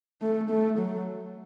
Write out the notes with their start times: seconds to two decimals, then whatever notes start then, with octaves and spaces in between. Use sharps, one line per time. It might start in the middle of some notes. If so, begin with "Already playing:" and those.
0.21 A3
0.50 A3
0.78 F#3